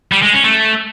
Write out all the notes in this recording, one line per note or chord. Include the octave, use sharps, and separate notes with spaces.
G3
G#3
C#4
A3